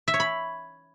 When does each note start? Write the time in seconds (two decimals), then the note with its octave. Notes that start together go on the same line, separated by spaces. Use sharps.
0.08 E5
0.14 C#5
0.20 B5